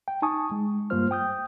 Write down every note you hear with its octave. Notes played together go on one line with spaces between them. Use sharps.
G5
D#4 G#5 A5 C#6 D#6
G#3
G2 G3 A#3 F4 C5 F6
G5 D#6 G6